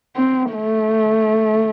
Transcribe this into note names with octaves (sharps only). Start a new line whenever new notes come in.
C4
A3